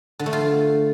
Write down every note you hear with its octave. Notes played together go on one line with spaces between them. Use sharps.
D3
A3
F4